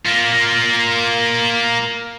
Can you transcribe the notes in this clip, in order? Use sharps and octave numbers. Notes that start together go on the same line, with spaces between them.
A#3 F4